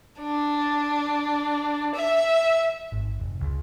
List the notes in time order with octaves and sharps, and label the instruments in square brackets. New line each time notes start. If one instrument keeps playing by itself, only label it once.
[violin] D4
E5
[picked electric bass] G#1
F1
C#2